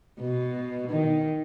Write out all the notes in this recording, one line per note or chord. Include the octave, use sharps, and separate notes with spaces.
B2
D#3